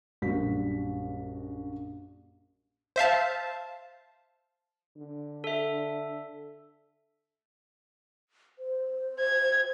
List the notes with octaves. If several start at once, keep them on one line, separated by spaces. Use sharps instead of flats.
A#1 F#2 G3 F#4 B6
C5 E5 F5 A5
D3
A4 E5
C5
G#6